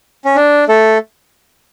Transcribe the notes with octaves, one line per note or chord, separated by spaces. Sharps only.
C#4
D4
A3 A4